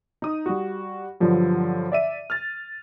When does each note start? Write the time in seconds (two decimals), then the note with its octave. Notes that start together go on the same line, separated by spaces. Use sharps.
0.22 D#4 D#6
0.46 G3 F#4
1.20 G2 D3 F3 F#3
1.92 D5 E5 D#7
2.30 F6 A6